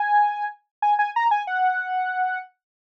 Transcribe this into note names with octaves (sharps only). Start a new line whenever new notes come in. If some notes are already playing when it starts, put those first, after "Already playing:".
Already playing: G#5
G#5
G#5
A#5
G#5
F#5